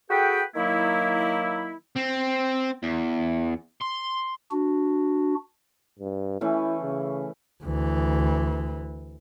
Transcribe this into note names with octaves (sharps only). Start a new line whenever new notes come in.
F#4 G#4 A4 B4 G5
D#3 F#3 A#3 E4
C4
E2
C6
D4 F#4
G2
E3 A3 C#4 E4
C#3
D2 E3